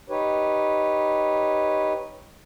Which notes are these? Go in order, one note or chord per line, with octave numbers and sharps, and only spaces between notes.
D#4 G4 B4 C#5